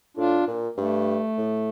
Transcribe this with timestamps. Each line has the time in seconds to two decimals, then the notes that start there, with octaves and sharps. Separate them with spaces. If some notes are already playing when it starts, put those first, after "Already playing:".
0.17 A2 D4 F4
0.47 A#2
0.77 G2 A3
1.38 A2